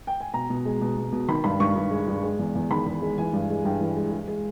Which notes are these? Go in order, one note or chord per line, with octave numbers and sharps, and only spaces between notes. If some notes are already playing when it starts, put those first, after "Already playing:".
G5
G#5
B2 A#5
B2
G#3
B2
B2
B2
D#3 B5
G2 B5
G2 C#6
G2
G#3
G2
G#3
E2
E2
D#3 B5
E2
G#3
E3 G#5
G2
G#3
G2 G5
E3
G#3
G#3
G#3